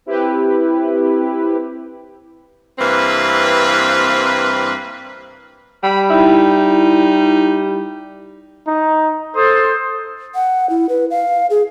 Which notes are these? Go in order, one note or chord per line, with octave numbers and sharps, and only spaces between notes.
C4 E4 G4 B4
G2 E3 A#3 C4 B4
G3 B5
D#4 E4
D#4
A4 C5 D#6
F#5
E4
B4
F5
G#4